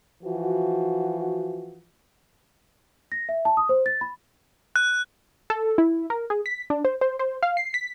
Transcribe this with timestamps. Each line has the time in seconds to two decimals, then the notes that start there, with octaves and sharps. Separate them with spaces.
0.24 E3 F3 F#4
3.12 A#6
3.29 E5
3.45 A5
3.57 D#6
3.69 C5
3.86 A6
4.01 B5
4.76 F#6
5.50 A4
5.78 E4
6.10 A#4
6.30 G#4
6.46 B6
6.70 D4
6.85 C5
7.01 C5
7.19 C5
7.43 F5
7.57 C7
7.74 B6